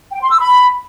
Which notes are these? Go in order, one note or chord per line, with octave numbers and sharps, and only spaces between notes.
G5
C6
E6
B5